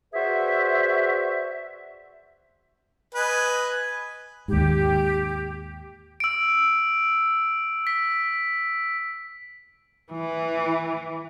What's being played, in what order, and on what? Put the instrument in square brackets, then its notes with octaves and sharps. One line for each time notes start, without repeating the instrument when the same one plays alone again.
[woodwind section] F#4 G#4 B4 C5 D5 E5
[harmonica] B4 D#5 G#5
[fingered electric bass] D#2 G#2 [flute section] G4
[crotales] E6 D7
B6
[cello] E3